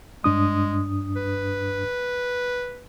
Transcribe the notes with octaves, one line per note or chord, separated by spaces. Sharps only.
G2 G#3 D4 D#6
B4